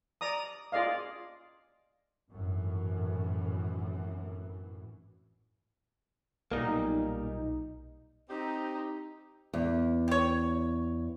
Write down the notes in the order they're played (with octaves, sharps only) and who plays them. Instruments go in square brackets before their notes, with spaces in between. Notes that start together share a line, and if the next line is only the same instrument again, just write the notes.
[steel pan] D5 A#5 D#6
F4 G#4 D5 D#5 F5
[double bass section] G#1 F#2 A2 E3
[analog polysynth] B1 D#4 [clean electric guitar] A#2 G3 A#3
[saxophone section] C4 G4 [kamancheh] D#4
[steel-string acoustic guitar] E2
[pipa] G4 C#5